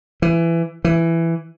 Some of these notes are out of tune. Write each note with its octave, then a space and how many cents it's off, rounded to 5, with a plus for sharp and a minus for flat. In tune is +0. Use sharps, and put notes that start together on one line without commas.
E3 +20
E3 +10